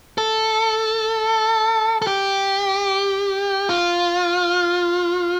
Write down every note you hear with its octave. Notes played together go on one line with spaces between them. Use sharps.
A4
A4
G4
F4